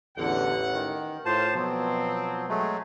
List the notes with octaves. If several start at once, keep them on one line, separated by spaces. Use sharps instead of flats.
A1 E2 D3 F#5
D#3
A2 F4 C5 A5
B2 F3 F#3 C4
F#3 G#3 A3